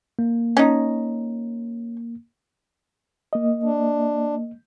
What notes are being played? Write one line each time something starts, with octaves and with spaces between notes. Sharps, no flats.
A#3
C#4 D#4
A#3 D#5
D4